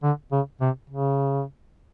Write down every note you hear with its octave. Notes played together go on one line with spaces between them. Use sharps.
D3
C#3
C3
C#3